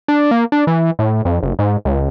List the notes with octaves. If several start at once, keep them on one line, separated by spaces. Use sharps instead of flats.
D4
A#3
D4
E3
A2
F2
F#1
G#2
C#2